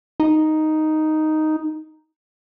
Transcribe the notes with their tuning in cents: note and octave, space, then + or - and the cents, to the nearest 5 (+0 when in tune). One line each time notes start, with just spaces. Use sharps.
D#4 +0